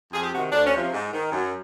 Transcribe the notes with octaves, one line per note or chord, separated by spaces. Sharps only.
F2 G#4
G4
C3 D#3 F#4
D2 D4
C#4
C3 F3
G#2
D#3
F#2